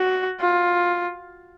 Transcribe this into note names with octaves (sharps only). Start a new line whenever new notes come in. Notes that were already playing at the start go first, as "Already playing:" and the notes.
Already playing: F#4
F4